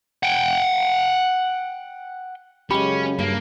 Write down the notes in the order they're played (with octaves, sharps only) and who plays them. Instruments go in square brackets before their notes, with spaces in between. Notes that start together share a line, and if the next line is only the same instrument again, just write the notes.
[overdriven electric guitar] F#5 G5
[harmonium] F#2 C#3 [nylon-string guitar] G#3 G4 [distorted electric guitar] C#4 [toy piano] B5
[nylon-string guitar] G2 [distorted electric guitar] A#3